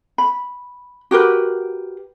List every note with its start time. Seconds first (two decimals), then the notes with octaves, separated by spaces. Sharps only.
0.18 B5
1.11 F#4 G4 A#4 B4